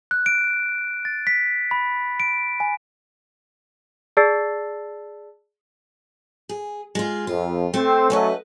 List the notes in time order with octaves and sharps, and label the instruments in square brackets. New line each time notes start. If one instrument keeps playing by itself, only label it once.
[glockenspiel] F#6
D7
A6
B6
B5
D7
G#5
[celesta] G#4 D5 A5 E6 A6 C7
[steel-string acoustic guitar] G#4
G#3 F4
[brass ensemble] F2 [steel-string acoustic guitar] F4
[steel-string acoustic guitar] A3 [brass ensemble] C4
[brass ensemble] F#3 A3 C#4 [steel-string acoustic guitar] B4 C5 D#5